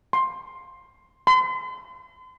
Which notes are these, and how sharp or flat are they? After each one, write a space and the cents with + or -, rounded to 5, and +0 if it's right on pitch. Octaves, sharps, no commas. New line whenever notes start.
C6 +10
C6 -40